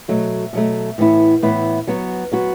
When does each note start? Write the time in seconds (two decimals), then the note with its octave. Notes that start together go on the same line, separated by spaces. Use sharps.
0.08 B2 F#3 A3
0.53 B2 F#3 A3
0.98 A2 E3 B3 E4
1.42 A2 E3 B3 E4
1.87 F#3 B3 F#4
2.32 F#3 B3 F#4